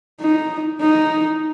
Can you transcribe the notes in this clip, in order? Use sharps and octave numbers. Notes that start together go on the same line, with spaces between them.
D#4
D#4